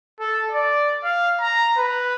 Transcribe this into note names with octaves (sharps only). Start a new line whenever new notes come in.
A4
D5
F5
A#5
B4